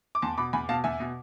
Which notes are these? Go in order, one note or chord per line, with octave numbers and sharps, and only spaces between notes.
D6
E2 A5 C6
B2 B5 D6
E2 G#5 B5
B2 F5 A5
E2 E5 G#5
B2